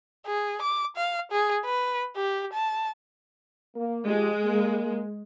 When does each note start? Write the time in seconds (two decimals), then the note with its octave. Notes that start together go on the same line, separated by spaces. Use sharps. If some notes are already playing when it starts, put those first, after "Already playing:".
0.27 G#4
0.62 D6
0.96 F5
1.32 G#4
1.65 B4
2.16 G4
2.53 A5
3.76 A#3
4.07 F3 G#3 G4
4.44 A#3